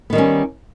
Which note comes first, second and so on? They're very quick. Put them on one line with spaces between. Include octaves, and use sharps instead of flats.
B3 D#3 G3 C#4